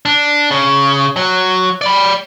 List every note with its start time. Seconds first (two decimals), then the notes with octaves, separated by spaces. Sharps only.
0.06 D4
0.51 C#3
1.16 F#3
1.81 D5 B5